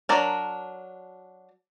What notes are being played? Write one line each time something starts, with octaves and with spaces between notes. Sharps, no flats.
F#3 D4 A#4